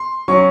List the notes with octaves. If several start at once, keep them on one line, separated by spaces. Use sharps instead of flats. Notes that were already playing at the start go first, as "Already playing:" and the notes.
Already playing: C6
F#3 C#4 C#6